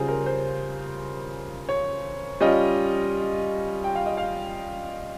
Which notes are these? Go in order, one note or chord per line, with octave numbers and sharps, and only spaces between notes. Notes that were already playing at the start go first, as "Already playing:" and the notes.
Already playing: C#3 G3 C#4 F4 G#4 C5
A#4
C5
C#5
G3 C#4 F4 D#5
G5
F5
D#5
F5